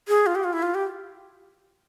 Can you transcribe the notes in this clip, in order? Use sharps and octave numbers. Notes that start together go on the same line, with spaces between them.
G#4
F4
G4
F4
E4
F4
G4